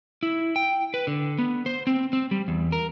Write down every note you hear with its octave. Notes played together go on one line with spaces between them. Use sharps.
E4
G5
B4
D3
B3
C5
C4
C4
G3
E2
A#4